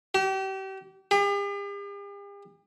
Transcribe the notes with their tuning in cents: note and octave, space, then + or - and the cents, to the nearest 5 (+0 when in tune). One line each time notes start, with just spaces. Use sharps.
G4 -35
G4 +45